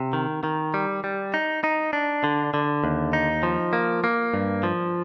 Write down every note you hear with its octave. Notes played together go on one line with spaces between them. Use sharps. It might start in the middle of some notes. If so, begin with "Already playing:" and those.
Already playing: C3
D#3
D#3
G3
G3
D#4
D#4
D4
D3
D3
D#2
D#4
F3
A#3
A#3
G2
F3